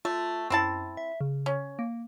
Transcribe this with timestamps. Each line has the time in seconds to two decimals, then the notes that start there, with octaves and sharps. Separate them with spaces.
0.05 A3 F4
0.50 F#2 C4 E4 A5
0.97 E5
1.21 C#3
1.46 C#4
1.79 A#3